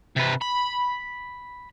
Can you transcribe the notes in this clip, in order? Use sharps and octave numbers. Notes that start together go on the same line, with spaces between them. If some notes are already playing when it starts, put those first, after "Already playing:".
C3 B4
B5